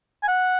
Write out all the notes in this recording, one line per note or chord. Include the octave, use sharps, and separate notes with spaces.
G#5
F#5